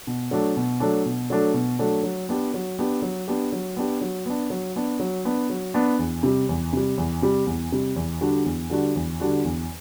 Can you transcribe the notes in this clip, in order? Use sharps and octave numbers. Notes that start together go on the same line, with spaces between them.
B2
F#3 A3 D4 A4
B2
F#3 A3 D4 A4
B2
F#3 A3 D4 A4
B2
F#3 A3 D4 A4
F#3
B3 D4 G4
F#3
B3 D4 G4
F#3
B3 D4 G4
F#3
B3 D4 G4
F#3
B3 D4
F#3
B3 D4
F#3
B3 D4
F#3
B3 D4
E2
C3 G3
E2
C3 G3
E2
C3 G3
E2
C3 G3
E2
D3 G3 D4 F#4
E2
D3 G3 D4 F#4
E2
D3 G3 D4 F#4
E2